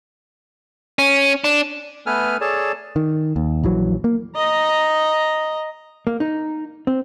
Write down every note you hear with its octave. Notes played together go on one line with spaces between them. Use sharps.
C#4
D4
A3 B3 A4 B4 G#5 F6
G#4 A4 C#5 D5 A5
D#3
D#2
A#1 E3 F#3
A#3
D#5 A#5
A#3
D#4
C4